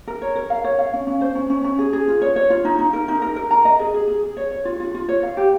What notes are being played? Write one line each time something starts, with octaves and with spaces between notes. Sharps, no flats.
A#4
C#5
A#4
F5
C#5
F5
C#4
C#4
C5
C#4
C#4
C#4
G#4
G#4
F4
C#5
C#5
F4
D#4
D#4
A#4
D#4
A#4
A#4
A#5
D#5
G#4
G#4
G#4
G#4
C#5
C#5
F4
F4
F4
C#5
F5
G4